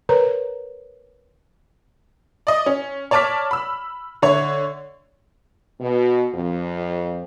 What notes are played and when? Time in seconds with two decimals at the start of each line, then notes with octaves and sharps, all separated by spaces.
0.09 A#4 B4 C#5 A#5
2.47 D5 D#5
2.66 C#4
3.11 C#5 D5 A5 D6 F6 B6
3.51 B5 E6
4.22 D3 C#5 E5
5.80 B2
6.35 F2